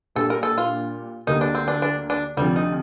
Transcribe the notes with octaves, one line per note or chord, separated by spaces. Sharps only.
A#2 G3 D4 A4
A#4
A4
F4
D2 D3 G3 A#3 D#4
D4
C4
D4
D4
D4
D2 C3 F3 G3
D#4